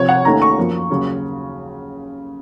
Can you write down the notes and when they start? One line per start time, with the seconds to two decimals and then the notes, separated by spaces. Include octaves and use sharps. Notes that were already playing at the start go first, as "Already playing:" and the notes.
Already playing: C2 C3 F3 C4 C#5
0.09 F#5
0.25 D#2 D#3 A3 C#4 A#5
0.42 C#6
0.58 F#2 F3 A#3
0.90 D#2 C#3 F#3